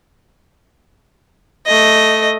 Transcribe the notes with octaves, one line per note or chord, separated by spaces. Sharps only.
A3 D#5